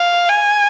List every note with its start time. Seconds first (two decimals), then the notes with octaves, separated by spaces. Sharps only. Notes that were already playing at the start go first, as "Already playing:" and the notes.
Already playing: F5
0.29 G#5